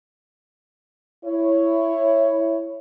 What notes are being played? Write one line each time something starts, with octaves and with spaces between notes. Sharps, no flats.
E4 C#5